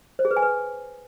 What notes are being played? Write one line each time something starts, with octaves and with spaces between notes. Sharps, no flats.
C5
G#4
B4
G#5
B4